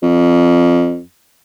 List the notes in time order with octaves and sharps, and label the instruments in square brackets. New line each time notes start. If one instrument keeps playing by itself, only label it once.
[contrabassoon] F2